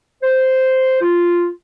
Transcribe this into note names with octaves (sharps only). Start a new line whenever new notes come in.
C5
F4